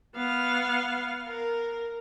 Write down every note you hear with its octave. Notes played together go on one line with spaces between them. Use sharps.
B3 F5
A#4